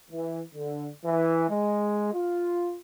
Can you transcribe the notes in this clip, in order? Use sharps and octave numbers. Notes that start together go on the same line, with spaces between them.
E3
D3
E3
G#3
F4